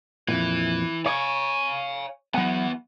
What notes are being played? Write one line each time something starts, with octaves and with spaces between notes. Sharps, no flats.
F2 A#2 E3
C#5 F5 G#5
E3 F#3 B3 F#5